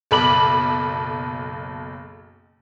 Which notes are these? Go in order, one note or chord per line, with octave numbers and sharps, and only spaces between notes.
F#1 B1 A4 B5 D6 F#7